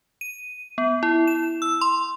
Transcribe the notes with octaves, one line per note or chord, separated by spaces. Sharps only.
D#7
B3
E4
E7
E6
C6